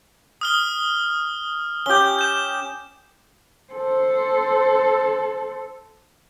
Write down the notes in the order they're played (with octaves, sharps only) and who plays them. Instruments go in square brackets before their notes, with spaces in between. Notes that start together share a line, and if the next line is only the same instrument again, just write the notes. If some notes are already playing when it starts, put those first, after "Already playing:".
[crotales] D#6 F6 G7
[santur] C#4 G4 [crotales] G6 G7
[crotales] G6 E7
[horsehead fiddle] A4 C5